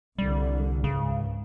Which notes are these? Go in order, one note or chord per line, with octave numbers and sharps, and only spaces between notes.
C2 D3 G3
C#2 G#2 C#3